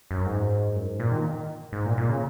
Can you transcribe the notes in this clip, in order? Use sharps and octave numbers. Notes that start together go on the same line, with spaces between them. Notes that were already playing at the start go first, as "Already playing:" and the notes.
F#2
G#2
F#2
G#2
A#2
D#3
G#2
A#2
A#2
C#3